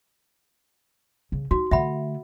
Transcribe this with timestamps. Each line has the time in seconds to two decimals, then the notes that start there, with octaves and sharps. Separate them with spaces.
1.32 C#3
1.51 D#4 F#4
1.71 D3 A3 E5 F#5 B5